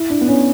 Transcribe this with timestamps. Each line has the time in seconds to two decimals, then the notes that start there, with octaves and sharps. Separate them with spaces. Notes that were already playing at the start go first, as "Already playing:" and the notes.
Already playing: E4
0.10 D4
0.21 B3
0.28 C#4